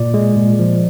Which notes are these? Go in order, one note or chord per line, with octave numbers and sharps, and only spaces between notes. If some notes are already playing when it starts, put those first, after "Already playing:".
Already playing: A#2 D5
G#3
A#2
F3